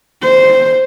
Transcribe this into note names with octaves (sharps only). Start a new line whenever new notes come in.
C5